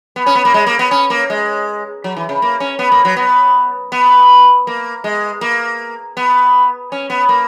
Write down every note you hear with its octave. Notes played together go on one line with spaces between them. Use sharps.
B3
C#4
B3
A#3
G#3
A#3
B3
C#4
A#3
G#3
F#3
E3
C#3
A#3
C#4
B3
A#3
F#3
B3
B3
A#3
G#3
A#3
B3
C#4
B3
A#3